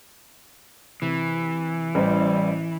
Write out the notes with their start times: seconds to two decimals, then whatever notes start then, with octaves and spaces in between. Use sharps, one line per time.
1.02 C3 E3
1.95 A1 G3 C5